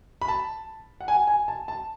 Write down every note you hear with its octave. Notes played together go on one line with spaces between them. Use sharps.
B5
A5
F#5
G#5
G#5
A5
A5